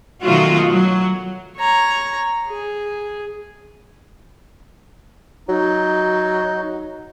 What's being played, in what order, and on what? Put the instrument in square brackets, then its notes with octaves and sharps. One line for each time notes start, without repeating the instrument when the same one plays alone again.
[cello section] B2 D#3 F#3 A3 F4 F#4
F#3
[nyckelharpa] C#5 A#5
G#4
[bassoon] F#3 [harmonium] D#4